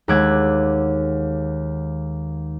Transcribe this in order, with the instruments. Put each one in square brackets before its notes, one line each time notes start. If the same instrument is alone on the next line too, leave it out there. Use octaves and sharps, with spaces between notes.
[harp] D#2 G#3 F#5 D6 E6 G#6